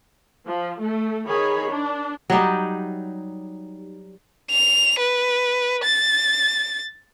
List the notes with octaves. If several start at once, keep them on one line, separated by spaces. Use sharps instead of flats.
F3
A3
D#3 G#4 C#5 B5
D4
F#3 G3 D#4 G4
F7
B4
A6